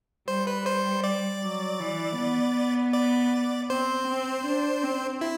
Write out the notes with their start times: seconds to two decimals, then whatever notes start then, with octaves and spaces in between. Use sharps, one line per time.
0.28 G3 C5
0.47 B4
0.66 C5
1.04 D5
1.42 F#3
1.80 E3
2.17 B3
2.93 D5
3.70 C4 C5
4.07 C4
4.45 D4
4.83 C4
5.21 E4